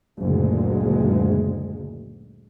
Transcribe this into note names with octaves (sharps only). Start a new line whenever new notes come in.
F#1 D2 A#2 G#3